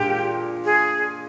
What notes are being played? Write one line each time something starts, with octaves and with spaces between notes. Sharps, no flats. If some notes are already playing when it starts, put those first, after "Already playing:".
Already playing: A#2 G#3 D4 G4
G#4